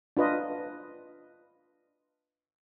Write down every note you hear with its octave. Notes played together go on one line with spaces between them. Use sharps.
D4 F4 B4 D#5